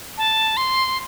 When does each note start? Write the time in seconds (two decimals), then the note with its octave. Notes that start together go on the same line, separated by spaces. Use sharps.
0.18 A5
0.57 C6